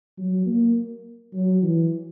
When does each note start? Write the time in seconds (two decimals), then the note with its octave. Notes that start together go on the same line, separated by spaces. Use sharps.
0.18 F#3
0.46 A#3
1.33 F#3
1.62 E3